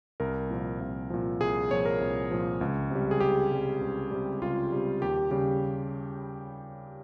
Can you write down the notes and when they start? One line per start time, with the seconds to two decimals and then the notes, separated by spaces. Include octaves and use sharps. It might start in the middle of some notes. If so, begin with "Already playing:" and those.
0.20 C2 A#4
0.51 A#2 F3
0.81 C2
1.10 A#2 F3
1.40 C2 G#4
1.71 A#2 F3 C#5
1.86 A#4
2.01 C2
2.31 A#2 F3
2.61 C#2
2.90 C3 G3
3.11 G#4
3.20 C#2 G4
3.51 C3 G3
3.81 C#2
4.11 C3 G3
4.41 C#2 F4
4.72 C3 G3
5.02 D#2 G4
5.31 C#3 G3 G4